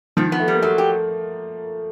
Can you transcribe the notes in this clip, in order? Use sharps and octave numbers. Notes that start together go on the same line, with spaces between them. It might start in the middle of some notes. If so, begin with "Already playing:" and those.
D#3 F3
B3
A3
G3
A#3
F#3 A3
G4